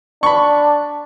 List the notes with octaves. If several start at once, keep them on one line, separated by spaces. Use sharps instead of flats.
D4 B5 C#6